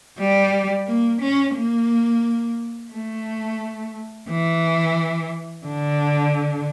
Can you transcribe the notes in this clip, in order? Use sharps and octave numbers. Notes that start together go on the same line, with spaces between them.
G3
A#3
C#4
A#3
A3
E3
D3